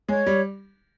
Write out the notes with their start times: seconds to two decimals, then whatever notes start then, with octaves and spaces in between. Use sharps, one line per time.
0.09 G#3 C#5
0.27 G3